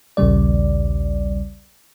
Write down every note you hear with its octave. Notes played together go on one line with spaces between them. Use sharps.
A#1 D#2 C#3 G3 D5